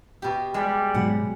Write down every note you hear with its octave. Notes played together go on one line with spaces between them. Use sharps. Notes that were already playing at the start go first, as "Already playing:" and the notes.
B2 G4
G3 G#3
G#2 B2 F#3 F#5